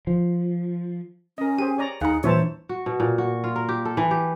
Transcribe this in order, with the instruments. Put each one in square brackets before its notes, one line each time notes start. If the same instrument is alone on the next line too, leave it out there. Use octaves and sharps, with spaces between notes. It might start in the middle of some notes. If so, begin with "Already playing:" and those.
[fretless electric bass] F3
[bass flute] C#4 [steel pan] A#4 D#5
[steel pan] G4 G#4 C5 [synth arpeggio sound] D#7
[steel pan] C#5 D5 A#5
[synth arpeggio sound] D#2 [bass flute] D#4 [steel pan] G#4 F#5 [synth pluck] F5 A#5
[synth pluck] A#2 E3 [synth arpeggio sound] G3 D4 [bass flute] C5 [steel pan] C#5 E5 A5
[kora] F#4
B2
A#2
F#4
F4
A#4
G4
A4
E3
G4